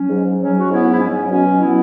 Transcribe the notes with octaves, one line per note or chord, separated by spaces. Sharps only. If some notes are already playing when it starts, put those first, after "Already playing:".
Already playing: F#3 C#4
G#2
G#2
F#3 C#4
F#3 F#4
G#2 B3 E4
G#2
E4
F#3 C#4
F#3
B2 C#4
B2
F#3 B3 E4